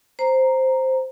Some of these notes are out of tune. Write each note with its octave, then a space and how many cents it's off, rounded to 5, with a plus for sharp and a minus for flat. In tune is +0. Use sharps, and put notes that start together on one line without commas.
C5 +0 A#5 +0